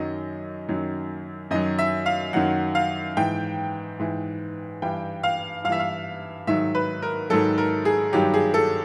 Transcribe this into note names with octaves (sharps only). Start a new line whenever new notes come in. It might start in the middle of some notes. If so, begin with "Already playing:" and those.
Already playing: F#2 D#3 F#3 D#5
F#2 D#3 F#3
F#2 D#3 F#3 D#5
E5
F5
F#2 D#3 F#3 F#5
F5
G#2 E3 G5
G#2 E3
G2 E3 G5
F5
G2 E3 E5 F5
F5
G#2 D#3 F#3 E5
B4
A#4
G#2 D#3 F#3 A4
A#4
G#4
G2 D#3 F#3 G4
G#4
A4